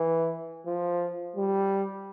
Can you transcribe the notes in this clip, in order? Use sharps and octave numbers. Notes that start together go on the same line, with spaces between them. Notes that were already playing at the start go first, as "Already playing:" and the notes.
Already playing: E3
F3
G3